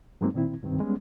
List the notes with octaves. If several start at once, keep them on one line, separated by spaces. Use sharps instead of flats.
G2 F#3 G#3 A#3 C4 D#4
A#2 D#3 C4 E4
C2 G2 D#3 C4
G3 G#3 B3 C#4